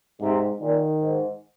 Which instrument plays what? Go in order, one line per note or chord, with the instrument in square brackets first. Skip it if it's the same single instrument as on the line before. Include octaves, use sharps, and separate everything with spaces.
[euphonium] G#2 [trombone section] C3
[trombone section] A#2 [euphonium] D#3
[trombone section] G#2